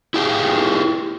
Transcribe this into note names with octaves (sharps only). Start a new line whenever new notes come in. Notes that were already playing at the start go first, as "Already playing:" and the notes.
E4 G4 G#4 G5